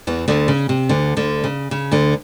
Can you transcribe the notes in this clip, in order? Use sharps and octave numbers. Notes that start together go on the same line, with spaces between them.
E2 E3
D2 D3
C#3
C3
D2 D3
D2 D3
C#3
C#3
D2 D3